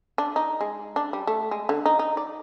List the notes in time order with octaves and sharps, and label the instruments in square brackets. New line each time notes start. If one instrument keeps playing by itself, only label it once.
[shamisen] D4
D#4
G#3
D4
G3
A3
G#3
D3
D#4
D#4
D5